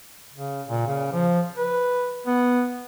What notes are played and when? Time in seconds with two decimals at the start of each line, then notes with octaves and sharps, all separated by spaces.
0.33 C#3
0.69 A#2
0.87 C#3
1.13 F3
1.57 B4
2.27 B3